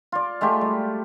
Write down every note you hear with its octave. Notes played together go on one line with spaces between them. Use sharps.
F4 D5
G#3 A3 F4 G4
G3